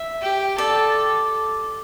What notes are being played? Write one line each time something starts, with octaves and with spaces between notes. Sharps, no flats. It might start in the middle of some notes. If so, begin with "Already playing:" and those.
Already playing: E5
G4
A4 D5